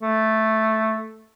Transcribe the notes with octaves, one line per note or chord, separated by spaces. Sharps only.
A3